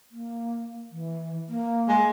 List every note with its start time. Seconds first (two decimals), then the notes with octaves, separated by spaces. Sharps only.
0.12 A#3
0.92 E3
1.49 A#3
1.89 G#3